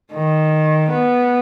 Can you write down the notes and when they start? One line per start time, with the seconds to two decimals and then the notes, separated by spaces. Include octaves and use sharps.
0.13 D#3
0.90 B3